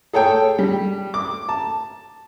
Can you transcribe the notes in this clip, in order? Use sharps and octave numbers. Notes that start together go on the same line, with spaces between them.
G#4 A4 C#5 G5
G3
D6
A5